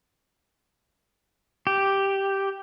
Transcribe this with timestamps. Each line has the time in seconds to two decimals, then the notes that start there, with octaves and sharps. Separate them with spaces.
1.67 G4